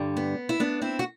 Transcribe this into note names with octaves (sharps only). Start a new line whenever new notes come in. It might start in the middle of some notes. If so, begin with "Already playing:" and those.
Already playing: G2 D3 G3
B3
E4
B3 D4
C4 E4
F#4